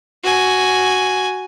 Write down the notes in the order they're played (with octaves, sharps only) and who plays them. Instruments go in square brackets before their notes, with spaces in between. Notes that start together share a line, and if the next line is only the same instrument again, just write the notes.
[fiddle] F#4 G#5